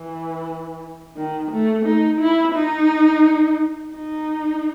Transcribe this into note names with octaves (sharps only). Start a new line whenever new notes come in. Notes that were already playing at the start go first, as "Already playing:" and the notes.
Already playing: E3
D#3
A3
D#4
E4
D#4
D#4